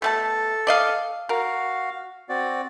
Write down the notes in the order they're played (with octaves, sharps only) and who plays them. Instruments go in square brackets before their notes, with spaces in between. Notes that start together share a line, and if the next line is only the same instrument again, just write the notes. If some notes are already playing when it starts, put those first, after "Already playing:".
[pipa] B2 A3 A5 [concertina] A4
[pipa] D5 D#5 F5
[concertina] F#4 F5 [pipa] A#4
[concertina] C4 F#4 D5